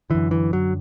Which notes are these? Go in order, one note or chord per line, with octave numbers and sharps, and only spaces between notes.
F#2 D3 E3
E3
F#3